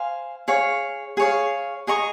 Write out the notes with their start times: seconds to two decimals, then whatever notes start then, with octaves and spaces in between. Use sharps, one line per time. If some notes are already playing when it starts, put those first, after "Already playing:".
Already playing: C5 F5 G#5
0.48 G#4 C#5 F5
1.17 G#4 C#5 F5
1.87 G#4 D#5 A#5 C#6